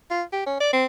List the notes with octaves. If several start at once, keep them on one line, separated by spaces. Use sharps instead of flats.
F4
G4
C#4
D5
C4